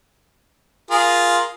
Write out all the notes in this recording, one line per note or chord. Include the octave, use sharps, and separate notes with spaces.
F4 G#4 A#4